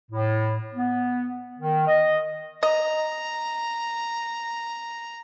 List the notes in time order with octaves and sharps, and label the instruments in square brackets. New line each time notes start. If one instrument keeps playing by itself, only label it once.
[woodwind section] A2
B3
D#3
D#5
[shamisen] D#5 [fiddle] A#5